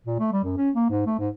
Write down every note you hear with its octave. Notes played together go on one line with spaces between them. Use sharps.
A#2
A3
G3
F#2
C#4
A#3
G#2
A3
G#2